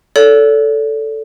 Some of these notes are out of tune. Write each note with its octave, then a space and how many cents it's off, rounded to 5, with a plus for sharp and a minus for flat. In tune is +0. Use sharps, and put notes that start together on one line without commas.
A4 +0 D5 -45